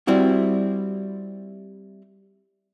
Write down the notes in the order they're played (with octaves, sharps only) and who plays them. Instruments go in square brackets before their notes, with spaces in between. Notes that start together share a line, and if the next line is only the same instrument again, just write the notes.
[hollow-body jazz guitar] G3 C4 E4 F#4